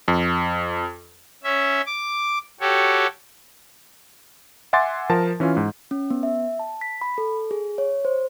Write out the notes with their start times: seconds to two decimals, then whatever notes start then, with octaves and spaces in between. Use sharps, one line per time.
0.08 F2
1.44 C#4 E5
1.86 D6
2.60 F#4 G4 A4 C#5
4.73 E5 F#5 G#5 C6 D6 A6
5.10 F3 A#4 A5
5.40 E3 C#4 E4 F4
5.57 G#2
5.91 C#4
6.10 B3
6.23 E5
6.59 A5
6.81 B6
7.01 B5
7.18 A4
7.51 G#4
7.78 C#5
8.05 C5